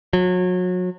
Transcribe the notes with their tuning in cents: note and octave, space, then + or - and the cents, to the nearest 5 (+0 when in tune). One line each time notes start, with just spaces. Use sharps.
F#3 -30